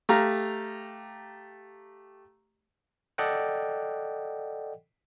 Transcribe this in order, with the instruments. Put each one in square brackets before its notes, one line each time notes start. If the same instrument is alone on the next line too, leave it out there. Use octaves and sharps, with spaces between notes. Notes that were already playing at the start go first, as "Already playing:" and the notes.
[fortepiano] A3 G4 F5 A#5
[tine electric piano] A4 D5 D#5 F#5 G5